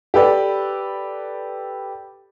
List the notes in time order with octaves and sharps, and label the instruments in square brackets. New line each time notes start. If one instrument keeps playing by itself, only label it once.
[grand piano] G4 A4 B4 D5